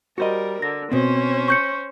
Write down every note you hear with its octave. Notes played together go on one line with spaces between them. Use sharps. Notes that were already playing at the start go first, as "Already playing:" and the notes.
G3 F#4 A#4 C5 D#5
D3 A#6
B2 C4 C#4 C5
C#6 G6 C#7